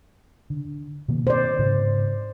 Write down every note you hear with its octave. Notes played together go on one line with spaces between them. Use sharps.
D3
B2 D#3 A#3
C5 D5
G#2 C#3